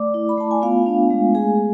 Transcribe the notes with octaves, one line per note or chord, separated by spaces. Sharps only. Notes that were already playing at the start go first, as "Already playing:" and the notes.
Already playing: A3 D5 D6
E4
B5
A3 A5
G#5
B3 F4 F5
D4
G#3
A3 G#4 G#5